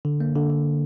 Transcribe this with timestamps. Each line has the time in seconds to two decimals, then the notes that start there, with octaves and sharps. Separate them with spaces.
0.05 D3
0.20 A#3
0.36 D3
0.50 D3